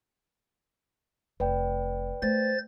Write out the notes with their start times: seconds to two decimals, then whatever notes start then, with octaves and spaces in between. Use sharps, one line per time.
1.40 F1 B4 D5 G5
2.22 A3 C5 A6